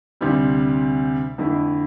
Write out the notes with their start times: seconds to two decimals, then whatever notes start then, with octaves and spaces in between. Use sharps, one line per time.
0.21 D2 C3 G3 C4
1.38 F2 D3 A3 E4